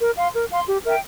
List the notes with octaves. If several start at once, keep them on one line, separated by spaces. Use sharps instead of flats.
A#4
F5 C6
A#4
F5 C6
G4
A#4 E5 G5